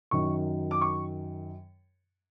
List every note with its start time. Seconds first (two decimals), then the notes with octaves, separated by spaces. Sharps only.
0.11 F#2 D#3 F#3 C#6
0.71 D6
0.81 C#6